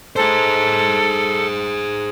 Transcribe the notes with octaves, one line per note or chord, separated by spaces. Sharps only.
G#4 A4 C5